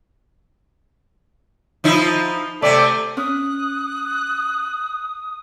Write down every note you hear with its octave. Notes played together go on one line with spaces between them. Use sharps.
F3 D#4 E4
C3 A3 C4 D5
C#4 D#6 F#6